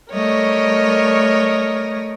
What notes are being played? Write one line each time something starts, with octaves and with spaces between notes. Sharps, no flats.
G3 A3 A#4 C#5 D#5